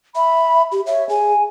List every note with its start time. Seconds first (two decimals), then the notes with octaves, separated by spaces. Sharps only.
0.15 E5 B5
0.72 G4
0.87 C#5 E5
1.09 G#4 G#5